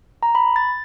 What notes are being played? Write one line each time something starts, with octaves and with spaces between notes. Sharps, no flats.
A#5
B5
A6